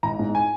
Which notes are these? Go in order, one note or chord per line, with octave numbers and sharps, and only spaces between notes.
G#1 A#5
G#2
G#5